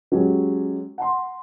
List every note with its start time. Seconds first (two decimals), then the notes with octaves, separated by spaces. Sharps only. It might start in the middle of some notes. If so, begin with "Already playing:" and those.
0.12 F#3 G#3 C#4 F#4 G4
0.98 F#5 A#5 C6